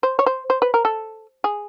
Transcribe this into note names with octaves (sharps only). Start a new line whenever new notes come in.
C5
C#5
C5
C5
B4
A#4
A4
G#4